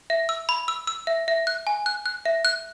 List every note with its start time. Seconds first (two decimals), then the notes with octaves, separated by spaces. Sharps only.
0.10 E5
0.29 E6
0.49 B5
0.68 E6
0.87 E6
1.07 E5
1.28 E5
1.47 F#6
1.67 G#5
1.86 F#6
2.06 F#6
2.26 E5
2.45 F#6